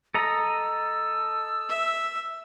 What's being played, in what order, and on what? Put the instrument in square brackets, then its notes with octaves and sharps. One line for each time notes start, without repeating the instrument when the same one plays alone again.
[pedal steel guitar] A4 D#5 A#5 [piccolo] E6
[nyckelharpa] E5